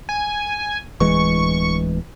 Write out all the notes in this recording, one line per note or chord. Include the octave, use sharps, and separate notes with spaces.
G#5
D1 E3 G#3 C#6